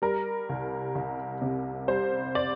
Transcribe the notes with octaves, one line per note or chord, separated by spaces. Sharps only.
G3 A#4
C2
C2
C3
G3 C5
D5